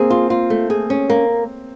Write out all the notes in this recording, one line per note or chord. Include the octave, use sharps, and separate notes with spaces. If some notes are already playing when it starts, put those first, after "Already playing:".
Already playing: A#3 C4 G#4
F4
F4
A3
G#4
C#4
A#3